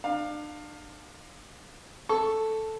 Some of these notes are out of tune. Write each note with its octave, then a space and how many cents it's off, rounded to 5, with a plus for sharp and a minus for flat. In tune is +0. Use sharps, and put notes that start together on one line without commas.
D4 +35 F5 +15
A4 +0 C#6 +0